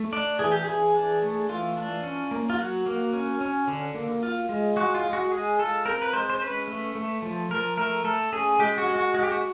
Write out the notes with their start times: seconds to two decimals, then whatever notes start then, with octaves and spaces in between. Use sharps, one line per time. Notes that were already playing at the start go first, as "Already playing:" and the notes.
Already playing: A3
0.13 D4 D5
0.39 E3 G#4
0.52 G4
0.65 E3 G#4
0.94 D4
1.22 A3
1.49 E3 F4
1.77 D4
2.03 C#4
2.31 A#3
2.50 F4
2.58 F#3 F#4
2.86 A#3
3.13 C#4
3.41 C#4
3.67 D3
3.94 A#3
4.23 F4
4.49 G#3
4.76 G#3 F#4
4.95 F4
5.05 G#3
5.13 F#4
5.32 G#3 G#4
5.59 F4 A4
5.86 C4 A#4
6.02 B4
6.13 G#3 C5
6.30 C5
6.41 C#4 B4
6.68 A3
6.95 A3
7.22 F3
7.50 F3 A#4
7.77 A3 A#4
8.04 A3 A4
8.33 C#4 G#4
8.59 G#3 G4
8.78 F#4
8.86 G#3
8.96 F#4
9.14 G#3 F#4
9.23 G4
9.31 F#4